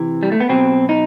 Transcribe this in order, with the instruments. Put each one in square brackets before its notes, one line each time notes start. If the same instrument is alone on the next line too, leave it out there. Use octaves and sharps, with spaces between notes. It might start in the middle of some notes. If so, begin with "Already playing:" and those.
Already playing: [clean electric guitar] C3 E3 C4
G3
A3
B3
B2 F#3 C4
D#4